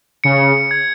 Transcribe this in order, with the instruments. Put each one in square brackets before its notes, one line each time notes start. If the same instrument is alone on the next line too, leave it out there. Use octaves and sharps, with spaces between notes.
[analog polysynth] C#3 [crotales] C#7
[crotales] G#6